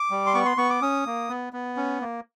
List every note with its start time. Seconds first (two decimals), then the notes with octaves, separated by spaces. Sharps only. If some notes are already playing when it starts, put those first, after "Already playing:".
Already playing: D6
0.11 G3
0.27 C6
0.34 B3 C#6
0.45 C6
0.57 B3 C#6
0.70 D6
0.82 C#4 D#6
1.06 A#3
1.29 B3
1.53 B3
1.77 C#4
2.01 A#3